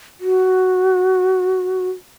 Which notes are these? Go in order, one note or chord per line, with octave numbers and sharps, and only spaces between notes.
F#4